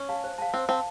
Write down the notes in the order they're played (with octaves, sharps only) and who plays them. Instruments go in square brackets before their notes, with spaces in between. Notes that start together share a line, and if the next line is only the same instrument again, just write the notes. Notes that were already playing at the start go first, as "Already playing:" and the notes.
Already playing: [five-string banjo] C#4
[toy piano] F5 A5
C5
F5 A5
[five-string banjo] C4 [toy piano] C5
[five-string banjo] C4 [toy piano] F5 A5